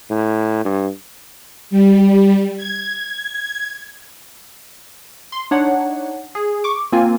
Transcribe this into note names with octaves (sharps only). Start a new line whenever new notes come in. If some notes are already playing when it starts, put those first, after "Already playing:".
A2
G2
G3
G#6
C6
D4 D#4 C#5 F#5
G#4
C#6 D6
A#3 C4 F4 G#5